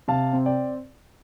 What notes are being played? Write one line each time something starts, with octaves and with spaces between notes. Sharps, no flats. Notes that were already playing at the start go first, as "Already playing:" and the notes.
C3 F5 A5
C4
D5 G5